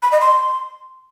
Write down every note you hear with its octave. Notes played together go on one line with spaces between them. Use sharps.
B5
D#5
C6